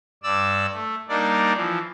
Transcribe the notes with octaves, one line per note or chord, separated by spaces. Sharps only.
G2 D5 E6
A3
G3 A#3 D4 D#4 D5
E3 F3